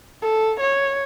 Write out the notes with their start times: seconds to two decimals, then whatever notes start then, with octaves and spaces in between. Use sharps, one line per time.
0.22 A4
0.60 C#5